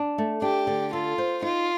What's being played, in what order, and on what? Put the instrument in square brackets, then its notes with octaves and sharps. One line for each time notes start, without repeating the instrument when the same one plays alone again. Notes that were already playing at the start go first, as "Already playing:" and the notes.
Already playing: [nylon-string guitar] D4
A3
[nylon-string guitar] D4 [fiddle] G4
[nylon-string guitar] D3
[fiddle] F4 [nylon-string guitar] A4
[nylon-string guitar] C5
[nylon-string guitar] D#4 [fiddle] F4